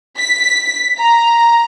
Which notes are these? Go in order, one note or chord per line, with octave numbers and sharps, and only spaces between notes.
B6
A#5